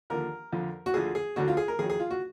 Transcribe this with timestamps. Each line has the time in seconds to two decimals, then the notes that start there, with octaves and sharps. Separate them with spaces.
0.10 D#2 D3 F3 A#4
0.52 F2 D3 F3
0.86 F#4
0.94 D2 D3 F3 G#4
1.15 G#4
1.36 D2 D3 F#3 F#4
1.48 F4
1.57 G#4
1.68 A#4
1.79 F2 D#3 F#3 G#4
1.90 G#4
2.00 F4
2.11 F#4